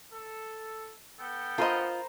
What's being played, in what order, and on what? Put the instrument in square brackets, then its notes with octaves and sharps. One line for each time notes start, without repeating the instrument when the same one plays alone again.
[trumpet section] A4
B3 A4 G5
[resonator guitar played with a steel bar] F4 D#5 [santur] A#4 C5 B5